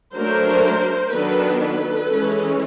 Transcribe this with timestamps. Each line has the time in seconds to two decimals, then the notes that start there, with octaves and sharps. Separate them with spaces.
0.14 F#3 A3 D4 A#4 C5
1.12 D#3 F#3 B3 D4 A4 B4
1.62 A4 B4
2.10 E3 G#3 C#4